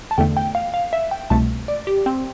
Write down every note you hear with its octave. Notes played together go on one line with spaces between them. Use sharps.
A5
E2 D3 A3 G5
G5
F5
F5
E5
G5
C2 B2 A3 A5
D5
G4
C4